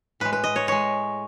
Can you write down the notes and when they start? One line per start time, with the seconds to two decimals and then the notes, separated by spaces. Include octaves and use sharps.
0.20 A2 G#3 B4
0.33 B4
0.44 D#5
0.56 C#5
0.67 A2 G#3 C#5